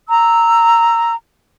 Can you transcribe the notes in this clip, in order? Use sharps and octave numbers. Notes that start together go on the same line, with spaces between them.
A#5 E6